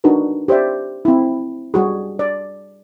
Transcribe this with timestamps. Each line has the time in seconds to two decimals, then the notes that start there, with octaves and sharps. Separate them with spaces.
0.04 D4 D#4 F#4 A#4 B4
0.48 G4 C5 D5 E5
1.05 C4 E4
1.74 G3 F#4 G#4
2.19 D5